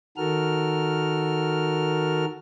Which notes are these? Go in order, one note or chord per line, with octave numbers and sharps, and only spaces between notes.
D#3 F#4 A4 A#4 F6